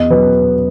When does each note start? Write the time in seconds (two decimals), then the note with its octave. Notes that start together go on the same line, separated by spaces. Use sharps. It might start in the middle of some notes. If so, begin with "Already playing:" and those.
Already playing: E2 D#5
0.10 F#3 B4